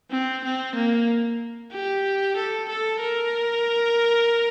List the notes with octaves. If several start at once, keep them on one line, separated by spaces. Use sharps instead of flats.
C4
C4
A#3
G4
A4
A4
A#4